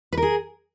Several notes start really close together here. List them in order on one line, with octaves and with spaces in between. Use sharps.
B4 A#4 G#4